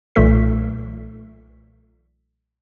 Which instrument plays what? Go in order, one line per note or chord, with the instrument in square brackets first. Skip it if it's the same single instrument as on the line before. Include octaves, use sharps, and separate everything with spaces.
[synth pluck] B1 A#2 E3 A3 A4 B6